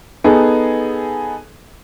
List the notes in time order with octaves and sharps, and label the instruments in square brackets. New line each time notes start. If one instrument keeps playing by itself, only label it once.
[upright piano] B3 D#4 G#4 A4